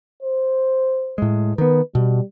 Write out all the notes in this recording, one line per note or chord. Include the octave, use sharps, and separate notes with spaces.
C5
A2 G#3
D#3 B3 B4
B2 G3